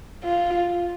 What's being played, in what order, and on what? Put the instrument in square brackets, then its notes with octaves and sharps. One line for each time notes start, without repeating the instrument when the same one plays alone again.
[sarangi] F4